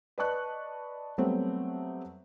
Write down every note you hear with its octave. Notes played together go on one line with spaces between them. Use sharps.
B4 D5 D#5 A5 C#6 F#6
F#3 G3 A3 B3 C4